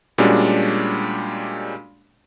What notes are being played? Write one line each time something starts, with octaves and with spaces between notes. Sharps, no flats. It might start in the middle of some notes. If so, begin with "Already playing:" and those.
A#2 G3 G#3 C#4 D4 F#4